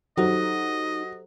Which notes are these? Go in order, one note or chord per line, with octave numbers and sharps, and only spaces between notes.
F#3 D#4 G4 A4 C5 D#5